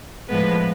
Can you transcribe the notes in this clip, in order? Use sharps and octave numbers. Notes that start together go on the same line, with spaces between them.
A2 F3 G#3 B3 B4